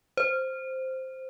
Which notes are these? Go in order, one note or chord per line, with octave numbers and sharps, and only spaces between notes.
C5